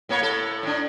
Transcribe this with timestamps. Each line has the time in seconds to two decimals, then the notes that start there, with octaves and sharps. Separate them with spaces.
0.09 A2 A#3 C#5
0.21 A2 A4
0.63 A2 D4